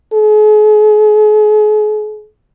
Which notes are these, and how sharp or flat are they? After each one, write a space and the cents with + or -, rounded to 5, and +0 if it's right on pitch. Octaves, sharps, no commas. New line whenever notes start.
G#4 +40